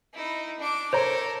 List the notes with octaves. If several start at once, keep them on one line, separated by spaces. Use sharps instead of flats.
D#4 E4
D4 D6
A4 A#4 C5 C#5 A#5